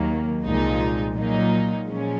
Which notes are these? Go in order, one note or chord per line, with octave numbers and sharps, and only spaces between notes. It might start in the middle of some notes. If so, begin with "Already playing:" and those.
Already playing: D#2 D#3 F#3 A#3
C2 A#2 F3 G#3 D#4
A#2 F#3 A#3 D#4
A#2 F3 G#3 C#4